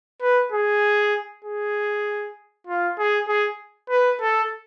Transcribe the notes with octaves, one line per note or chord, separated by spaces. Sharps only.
B4
G#4
G#4
F4
G#4
G#4
B4
A4